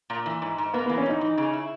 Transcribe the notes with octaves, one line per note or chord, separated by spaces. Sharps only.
A#2
E3
G#2
G#2
A#3 B3
B3
E3
C#4
G#2 D#4
E3
C#3
E4